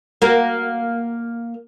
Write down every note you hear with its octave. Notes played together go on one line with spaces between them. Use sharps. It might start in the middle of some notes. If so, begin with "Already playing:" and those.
A#3 F#4 A#4